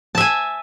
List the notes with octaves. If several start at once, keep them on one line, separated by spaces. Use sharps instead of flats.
E5 G#5 A5